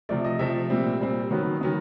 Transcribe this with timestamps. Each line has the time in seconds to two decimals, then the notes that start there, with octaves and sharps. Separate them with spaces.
0.09 C3 F3 A3 D5
0.24 D#5
0.39 C3 F3 A3 E5
0.70 A#2 G3 C4
1.00 A#2 G3 C4
1.31 D#3 F#3 B3
1.61 D#3 F#3 B3